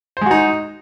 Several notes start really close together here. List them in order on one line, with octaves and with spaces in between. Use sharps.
C5 G#3 F#4 D#4